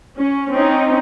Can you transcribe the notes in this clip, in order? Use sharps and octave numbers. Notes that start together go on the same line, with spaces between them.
C#4
C4 C#4 D#4